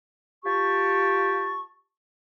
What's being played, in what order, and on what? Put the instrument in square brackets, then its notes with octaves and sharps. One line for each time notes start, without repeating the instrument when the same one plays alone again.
[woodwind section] F4 G4 A5 C#6